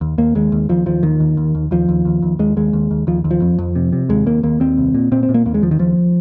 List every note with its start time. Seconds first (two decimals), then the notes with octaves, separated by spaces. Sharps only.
0.01 D#2
0.18 D#2 A#3
0.35 D#2 G#3
0.52 D#2
0.69 D#2 F3
0.86 D#2 F3
1.03 D#2 D#3
1.20 D#2
1.37 D#2
1.55 D#2
1.71 D#2 F3
1.89 D#2
2.05 D#2
2.22 D#2
2.39 D#2 G#3
2.57 D#2 G#3
2.73 D#2
2.91 D#2
3.07 D#2 F3
3.24 D#2
3.31 F3
3.42 F2
3.59 F2
3.75 C3
3.92 C3
4.09 D#2 G#3
4.26 D#2 A#3
4.43 D#2 A#3
4.60 D#2 C4
4.78 C2
4.95 A#2
5.12 A#2 C4
5.23 C4
5.29 A#2
5.34 A#3
5.46 D#2 A#3
5.54 G#3
5.62 D#2 F3
5.71 D#3
5.79 D#2 F3